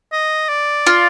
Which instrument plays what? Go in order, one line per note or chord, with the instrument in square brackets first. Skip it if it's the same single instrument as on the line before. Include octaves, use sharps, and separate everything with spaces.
[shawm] D#5
D5
[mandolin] F4